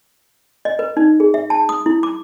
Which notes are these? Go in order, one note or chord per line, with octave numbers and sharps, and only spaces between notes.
D#5
B4
D#4
G#4
E5
A5
D#6
E4
D6